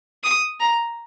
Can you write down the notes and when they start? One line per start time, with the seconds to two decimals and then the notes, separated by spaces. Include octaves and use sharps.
0.24 D#6
0.60 A#5